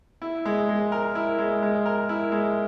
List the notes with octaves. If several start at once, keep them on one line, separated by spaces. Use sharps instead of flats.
E4
G#3
G#3
A#4
E4
G#3
G#3
A#4
E4
G#3